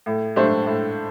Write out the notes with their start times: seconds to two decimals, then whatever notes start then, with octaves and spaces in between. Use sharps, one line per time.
0.06 A2
0.36 A3 D4 G4 C5
0.66 A2